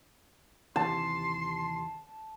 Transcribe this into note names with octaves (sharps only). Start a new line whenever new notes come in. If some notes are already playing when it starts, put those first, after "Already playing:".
D#2 C3 E3 A5 C6